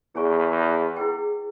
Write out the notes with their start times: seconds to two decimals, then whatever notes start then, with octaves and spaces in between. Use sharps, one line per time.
0.15 E2 G#4 C#5 G#5 C#6
0.96 E4 G#4 B4 G5